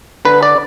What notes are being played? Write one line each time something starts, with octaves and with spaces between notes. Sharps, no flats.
D3 B4
D5